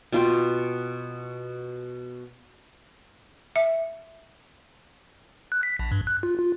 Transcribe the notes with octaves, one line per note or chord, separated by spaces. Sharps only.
B2 F4 G5
E5
F#6
B6
A#1
G2
F#6
F4
F4